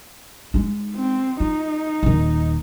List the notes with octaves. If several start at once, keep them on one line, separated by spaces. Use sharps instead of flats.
G#3 D#4
C4
D#4 F4
D#1 D#3